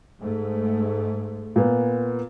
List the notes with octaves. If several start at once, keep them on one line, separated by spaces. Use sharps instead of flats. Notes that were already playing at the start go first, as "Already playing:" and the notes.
G#2 A3
A#2 B3